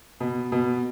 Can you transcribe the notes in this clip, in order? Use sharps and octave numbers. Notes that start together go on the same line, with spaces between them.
B2
B2